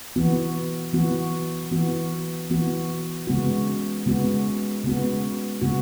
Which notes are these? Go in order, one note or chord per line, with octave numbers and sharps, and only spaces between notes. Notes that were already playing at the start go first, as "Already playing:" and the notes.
E3 B3 F#4
E3 B3 F#4
E3 B3 F#4
E3 B3 F#4
C#3 G#3 B3 F#4
C#3 G#3 B3 F#4
C#3 G#3 B3 F#4
C#3 G#3 B3 F#4